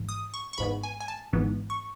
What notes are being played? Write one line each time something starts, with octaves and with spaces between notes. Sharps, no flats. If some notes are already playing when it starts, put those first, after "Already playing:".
Already playing: G#1 G#2 E3
D#6
C#6
C#6
G#1 G#2 E3 B3 B5
G#5
G#5
A5
G#1 G#2 E3 B3
C#6